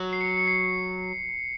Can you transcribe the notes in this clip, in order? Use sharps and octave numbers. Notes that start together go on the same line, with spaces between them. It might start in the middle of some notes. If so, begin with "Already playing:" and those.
Already playing: F#3
C7
C#7
C#7
C7